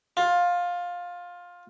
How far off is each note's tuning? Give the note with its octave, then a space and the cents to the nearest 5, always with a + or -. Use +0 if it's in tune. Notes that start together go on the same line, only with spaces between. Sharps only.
F4 +15